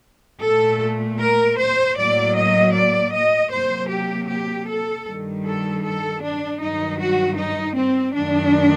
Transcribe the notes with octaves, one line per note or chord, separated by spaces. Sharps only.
A#2 A3 A4
A#4
C5
A2 F#3 A#3 D5
D#5
D5
D#5
C3 F#3 A#3 C5
G4
G4
A4
G2 D#3 G3
A4
A4
D4
G2 D#3 F#3 D#4
F#4
D#4
C4
F#2 D#3 A3 D4